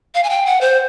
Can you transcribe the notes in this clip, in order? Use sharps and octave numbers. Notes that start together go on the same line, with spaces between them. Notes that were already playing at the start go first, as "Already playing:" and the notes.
F5
G#5
G5
F#5
C5